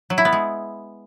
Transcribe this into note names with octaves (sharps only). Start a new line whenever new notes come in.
F#3
E4
B3
G#3